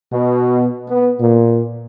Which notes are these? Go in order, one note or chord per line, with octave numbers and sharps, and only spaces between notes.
B2
B3
A#2